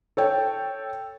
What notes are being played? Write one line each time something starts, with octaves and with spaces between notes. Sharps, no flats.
A4 C#5 G5